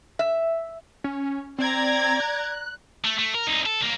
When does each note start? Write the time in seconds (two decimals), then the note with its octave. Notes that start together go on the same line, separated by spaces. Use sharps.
0.19 E5
1.04 C#4
1.58 C4 D5 A#5 G#6
2.20 F#6
3.05 A3
3.19 A3
3.35 A#4
3.47 C2 D#4
3.66 A4
3.81 C2 A#3